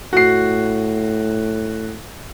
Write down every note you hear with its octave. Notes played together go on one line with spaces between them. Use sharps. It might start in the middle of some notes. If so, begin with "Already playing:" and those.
A2 F#4 C7